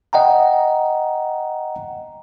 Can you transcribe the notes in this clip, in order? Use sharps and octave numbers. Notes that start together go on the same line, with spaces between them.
D#5 F#5 G5 A#5